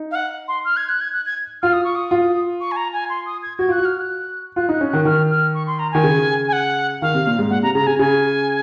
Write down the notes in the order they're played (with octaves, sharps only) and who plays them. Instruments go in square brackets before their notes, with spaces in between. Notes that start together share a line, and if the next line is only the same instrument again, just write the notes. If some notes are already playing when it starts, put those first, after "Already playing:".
Already playing: [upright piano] D#4
[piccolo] F5
F#5
C6
F6
G#6
F#6
G#6
F#6
G#6
[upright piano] F4 [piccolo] F6
[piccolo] D#6
C#6
D#6
[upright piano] F4
[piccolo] C#6
G#5
A#5
G#5
C6
D#6
G#6
[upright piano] F#4 [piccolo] G#6
[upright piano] F4 [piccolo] F#6
[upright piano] F#4
[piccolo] F6
F#6
[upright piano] F4 [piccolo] F#6
[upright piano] D#4 [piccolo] F#6
[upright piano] C#4
[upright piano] D#3 [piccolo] F#6
[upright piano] D#3 [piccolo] F6
[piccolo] F6
C#6
C6
A#5
[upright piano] D#3 [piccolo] G#5
[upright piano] C#3
[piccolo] G#5
F#5
[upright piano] D#3 [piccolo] F5
[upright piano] C3
A#2
G#2
[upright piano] A#2 [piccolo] F#5
[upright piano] C3 [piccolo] A#5
[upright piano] C#3 [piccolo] A#5
[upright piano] C#3 [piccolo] G#5
[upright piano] C#3 [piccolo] G#5